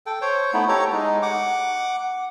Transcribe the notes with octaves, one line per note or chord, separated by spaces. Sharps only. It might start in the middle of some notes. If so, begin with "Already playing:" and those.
A4 G5
C5 C#5
A3 B3 D#4 E4
G4 A4 C#5 A#5
G#3 D#4
F#5 D6